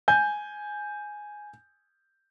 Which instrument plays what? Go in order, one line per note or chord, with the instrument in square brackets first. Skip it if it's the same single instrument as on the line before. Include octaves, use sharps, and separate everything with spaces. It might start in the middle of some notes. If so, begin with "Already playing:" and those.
[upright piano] G#5 G6